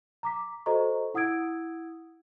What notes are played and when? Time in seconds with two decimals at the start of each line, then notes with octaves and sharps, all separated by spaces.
0.23 A#5 D6 B6
0.66 F#4 A4 C5 D#5 A#5 C#6
1.14 E4 F#5 D#6 E6 G#6 D7